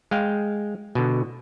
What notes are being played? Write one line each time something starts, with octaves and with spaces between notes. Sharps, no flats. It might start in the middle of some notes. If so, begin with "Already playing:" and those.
G#3 F5 G5
B2 D3